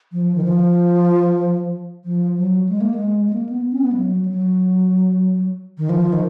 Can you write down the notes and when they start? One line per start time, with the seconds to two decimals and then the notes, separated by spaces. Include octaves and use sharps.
0.12 F3
0.36 D#3
0.45 F3
2.05 F3
2.37 F#3
2.69 G#3
2.81 A#3
2.94 G#3
3.28 G#3
3.33 A#3
3.49 B3
3.72 C#4
3.81 B3
3.92 G#3
3.97 F#3
4.25 G#3
4.29 F#3
5.78 D#3
5.89 F3
6.13 D#3